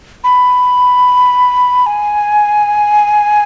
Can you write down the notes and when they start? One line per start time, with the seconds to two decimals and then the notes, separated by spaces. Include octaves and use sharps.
0.24 B5
1.86 G#5